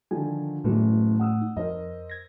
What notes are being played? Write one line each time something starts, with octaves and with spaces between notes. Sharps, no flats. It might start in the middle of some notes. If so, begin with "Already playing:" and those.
D3 D#3 F3 G#5
F#1 E2 A2 E3 A3
F#5 D#6 E6
D#4
F2 A#4 C5 D#5
G#6 A#6